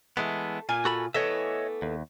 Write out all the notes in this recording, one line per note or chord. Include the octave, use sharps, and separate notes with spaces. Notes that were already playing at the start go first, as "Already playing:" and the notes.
E3 G#3 A3 B3
A#2 F4 G#5
F#4 A4 B5
E3 A3 B3 C#5 D#5 E5
D#2